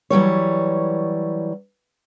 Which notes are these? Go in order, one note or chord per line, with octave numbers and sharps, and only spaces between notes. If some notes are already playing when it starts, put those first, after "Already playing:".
E3 F#3 G3 C#5